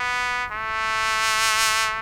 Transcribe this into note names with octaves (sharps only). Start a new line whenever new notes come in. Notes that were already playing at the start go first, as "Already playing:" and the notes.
Already playing: B3
A3